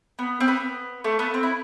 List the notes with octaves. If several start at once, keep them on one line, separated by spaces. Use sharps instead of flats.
B3
C4
B3
A3
B3
C4
E4